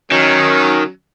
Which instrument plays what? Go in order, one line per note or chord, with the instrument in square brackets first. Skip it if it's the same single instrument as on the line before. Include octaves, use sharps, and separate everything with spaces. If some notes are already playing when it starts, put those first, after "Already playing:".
[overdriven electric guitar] D#3 [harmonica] F#3 C#4